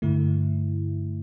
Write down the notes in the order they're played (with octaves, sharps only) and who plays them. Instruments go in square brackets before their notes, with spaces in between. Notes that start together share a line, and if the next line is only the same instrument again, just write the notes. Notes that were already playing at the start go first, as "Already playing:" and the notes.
[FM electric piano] G2 D3 A3 E4